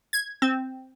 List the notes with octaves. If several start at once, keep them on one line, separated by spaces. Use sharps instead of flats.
G#6
C4